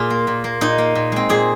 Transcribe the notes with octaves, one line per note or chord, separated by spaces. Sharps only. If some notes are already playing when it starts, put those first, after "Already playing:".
Already playing: A#2 F4 G#4
A#3
A#2
A#3
A#2 D#4
A#3
A#2
G#3 C4
A#2 G#4